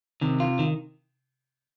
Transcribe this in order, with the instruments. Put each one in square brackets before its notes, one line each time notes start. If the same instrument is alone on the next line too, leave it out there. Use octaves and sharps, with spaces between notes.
[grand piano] C3 [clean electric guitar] D#3
[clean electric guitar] F4
D#3